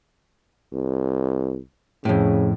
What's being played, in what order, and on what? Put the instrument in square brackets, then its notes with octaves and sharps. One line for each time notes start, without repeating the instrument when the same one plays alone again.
[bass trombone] C2
[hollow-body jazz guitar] F2 A2 [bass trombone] C#3